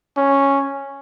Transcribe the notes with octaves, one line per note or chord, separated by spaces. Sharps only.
C#4